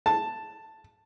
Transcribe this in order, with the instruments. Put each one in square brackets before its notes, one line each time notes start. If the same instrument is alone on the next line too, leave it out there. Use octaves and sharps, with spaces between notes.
[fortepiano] A5